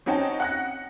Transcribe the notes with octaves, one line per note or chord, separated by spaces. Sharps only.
C4 C#4 D#4 F#5 G5 A5
F#5 F#6 A#6